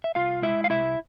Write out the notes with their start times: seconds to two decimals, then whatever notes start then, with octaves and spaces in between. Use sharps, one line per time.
0.04 E5
0.15 C2 F4 F5
0.42 G#3 E4 E5
0.64 F5
0.70 C2 E4 E5